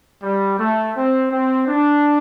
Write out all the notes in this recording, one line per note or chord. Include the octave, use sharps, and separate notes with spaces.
G3
A3
C4
C4
D4